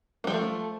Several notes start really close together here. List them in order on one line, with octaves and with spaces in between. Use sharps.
A#3 G3 F3 A3